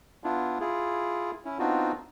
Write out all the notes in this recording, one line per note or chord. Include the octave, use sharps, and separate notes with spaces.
B3 D4 E4 F4
E4 F4 G#4
C#4 E4
B3 C4 D4 D#4 F4 F#4